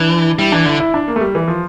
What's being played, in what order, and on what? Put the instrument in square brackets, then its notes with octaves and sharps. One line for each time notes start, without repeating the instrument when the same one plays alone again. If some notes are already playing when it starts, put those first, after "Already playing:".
Already playing: [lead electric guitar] E3 [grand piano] D4
[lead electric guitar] G3 [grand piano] E4
[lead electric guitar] E3 [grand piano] D4
[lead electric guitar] D3 [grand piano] E4
[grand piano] E4
D4
A#3
A3
G3
E3
F3